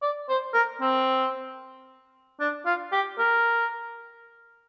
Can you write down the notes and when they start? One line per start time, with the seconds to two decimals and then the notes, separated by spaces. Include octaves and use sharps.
0.02 D5
0.29 C5
0.54 A#4
0.81 C4
2.40 D4
2.66 F4
2.92 G4
3.19 A#4